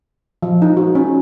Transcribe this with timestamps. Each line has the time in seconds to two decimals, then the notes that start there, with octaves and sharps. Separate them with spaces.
0.43 F3
0.62 D#4
0.77 F#4
0.95 C#4